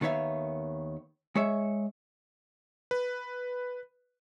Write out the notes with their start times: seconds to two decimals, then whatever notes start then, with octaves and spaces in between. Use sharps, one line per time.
0.01 D#2 D#3 B3 C#5 E5 F5
1.36 G#3 C#5 E5
2.91 B4